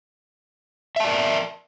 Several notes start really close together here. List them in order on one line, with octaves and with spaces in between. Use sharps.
E5 A5 D5 A#4